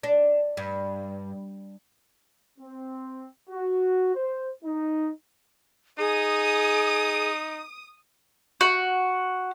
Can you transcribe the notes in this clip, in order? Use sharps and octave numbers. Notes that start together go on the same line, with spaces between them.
D4
G2
C4
F#4
C5
D#4
D#4 G#4 D#6
F#4